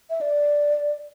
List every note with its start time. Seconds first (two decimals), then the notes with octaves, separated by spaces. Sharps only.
0.10 E5
0.21 D5